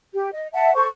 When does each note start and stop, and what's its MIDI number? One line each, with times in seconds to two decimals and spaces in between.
0.14 0.29 67
0.33 0.48 75
0.54 0.73 76
0.54 0.73 78
0.54 0.73 81
0.75 0.87 69
0.75 0.87 72
0.75 0.87 85